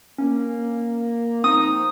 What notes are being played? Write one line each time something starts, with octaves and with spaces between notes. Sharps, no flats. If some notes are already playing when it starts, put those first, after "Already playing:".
A#3 C#4
F3 C4 D#4 D#6